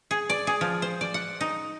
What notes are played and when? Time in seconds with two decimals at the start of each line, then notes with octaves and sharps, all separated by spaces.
0.11 G#4
0.30 D5
0.47 G#4
0.61 F3
0.82 C5
1.01 D5
1.14 F#5
1.41 D#4